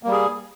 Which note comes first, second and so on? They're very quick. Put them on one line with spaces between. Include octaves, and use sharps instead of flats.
A#3 G3 G#4